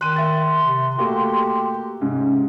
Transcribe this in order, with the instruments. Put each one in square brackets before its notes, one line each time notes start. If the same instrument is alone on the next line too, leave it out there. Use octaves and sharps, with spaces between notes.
[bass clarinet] D#3 [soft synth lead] C6 [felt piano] F#6 D#7
[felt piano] E5 A6
[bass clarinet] C3
[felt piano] A3 A#3 F#4 [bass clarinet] G4
[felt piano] G#2 [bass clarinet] C3 [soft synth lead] C#4